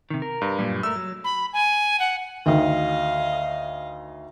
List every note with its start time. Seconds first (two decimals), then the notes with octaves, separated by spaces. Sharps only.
0.10 C3 D#3
0.22 A#4
0.42 G2
0.59 F#2 A#2 G3
0.83 A3 A#4 E6
0.96 F#3
1.24 B5
1.53 G#5
2.00 F#5
2.46 D2 D#3 D#5 F5